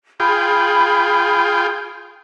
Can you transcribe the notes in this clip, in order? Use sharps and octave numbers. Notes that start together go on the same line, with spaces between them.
F4 G#4 G5 B5